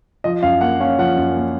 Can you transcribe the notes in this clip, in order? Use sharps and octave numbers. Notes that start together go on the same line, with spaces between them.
F3 D#5
F#2 F5
A#3 F#5
C#4 F5
F3 F#5
F#2
A#3